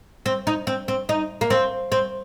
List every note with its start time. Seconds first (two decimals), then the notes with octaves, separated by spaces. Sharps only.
0.26 C4
0.47 D#4
0.67 C4
0.88 C4
1.09 D#4
1.41 A#3
1.50 C4
1.92 C4